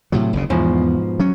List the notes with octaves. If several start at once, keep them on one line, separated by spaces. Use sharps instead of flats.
A2 C3 F#3
F#1 D2 C#3
E2 G#2 B2 F3
F#3 C#4